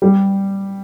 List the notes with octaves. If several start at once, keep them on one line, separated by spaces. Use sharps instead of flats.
G3